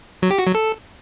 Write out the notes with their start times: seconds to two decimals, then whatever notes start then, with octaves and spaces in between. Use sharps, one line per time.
0.22 F#3
0.31 G4
0.39 F#4
0.47 F#3
0.55 A4